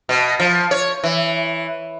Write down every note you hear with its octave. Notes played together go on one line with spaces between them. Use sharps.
B2
F3
C#5
E3